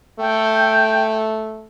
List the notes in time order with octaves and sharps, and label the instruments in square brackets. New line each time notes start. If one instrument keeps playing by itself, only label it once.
[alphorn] A3 [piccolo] G5